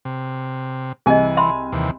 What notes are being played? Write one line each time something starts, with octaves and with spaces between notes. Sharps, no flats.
C3
C2 E3 G#4 D#5 G#5
E5 B5 C6
D#2 C3 E3